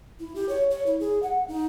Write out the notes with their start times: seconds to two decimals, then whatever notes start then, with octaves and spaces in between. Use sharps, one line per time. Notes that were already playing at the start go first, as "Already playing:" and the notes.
0.20 E4
0.35 G4
0.49 C#5
0.71 C#5
0.86 E4
1.00 G#4
1.23 F#5
1.48 D#4